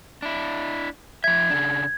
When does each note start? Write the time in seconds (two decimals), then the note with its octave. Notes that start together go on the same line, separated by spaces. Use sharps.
0.22 D4 E4
1.24 F3 E5 G#6
1.50 C#3 D4